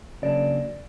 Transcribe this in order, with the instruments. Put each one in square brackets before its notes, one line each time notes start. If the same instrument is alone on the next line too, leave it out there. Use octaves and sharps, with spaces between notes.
[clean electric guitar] C#3 F#3 A#3 D4 [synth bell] D5